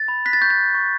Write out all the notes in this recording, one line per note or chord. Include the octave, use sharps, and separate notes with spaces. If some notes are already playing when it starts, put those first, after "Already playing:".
Already playing: A6
B5
F#6 B6
A6
C#6 G6
A6
F#6
C#6